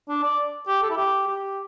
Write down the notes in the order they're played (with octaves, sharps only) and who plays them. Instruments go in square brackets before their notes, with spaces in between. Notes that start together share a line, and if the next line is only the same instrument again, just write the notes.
[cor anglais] D4
D5
G4
A4
E4
G4
G4